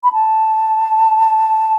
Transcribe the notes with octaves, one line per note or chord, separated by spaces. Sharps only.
B5
A5